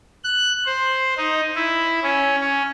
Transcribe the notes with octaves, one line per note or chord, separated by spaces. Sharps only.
F#6
C5
D#4
E4
C#4
C#4